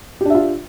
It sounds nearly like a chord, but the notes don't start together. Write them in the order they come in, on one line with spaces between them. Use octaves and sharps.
G4 D4 E5 F4